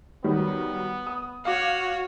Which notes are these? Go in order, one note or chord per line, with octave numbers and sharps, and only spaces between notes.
D#3 F#3 G3 B3
D#6
F#4 C#5 F5 D6